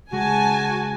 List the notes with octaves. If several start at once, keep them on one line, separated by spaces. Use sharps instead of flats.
C#3 G#3 F#4 G#4 G#5 A5